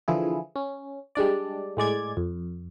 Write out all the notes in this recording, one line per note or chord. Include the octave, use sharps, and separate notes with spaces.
D3 E3 F3 E4 G#4
C#4
G3 G#3 D4 D5
A2 G#3 D5 G#6
F2